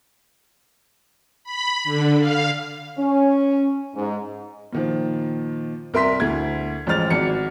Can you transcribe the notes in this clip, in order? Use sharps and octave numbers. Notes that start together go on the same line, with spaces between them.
B5
D3
F5
C#4
G#2
A#2 D#3 F3
C2 A#4 E5 C6 B6
D2 E4 G#6
A1 F3 G#3 F6 A6 F7
G#1 F#4 D5 C#7